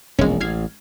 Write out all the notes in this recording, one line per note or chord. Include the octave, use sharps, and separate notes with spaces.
E1 A#1 G#3 C#4
A1 F6 G#6 C7